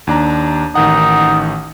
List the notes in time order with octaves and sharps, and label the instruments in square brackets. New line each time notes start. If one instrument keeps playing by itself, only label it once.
[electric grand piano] D#2 D4 A#5
[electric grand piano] A1 D#3 F#5 [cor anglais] D#4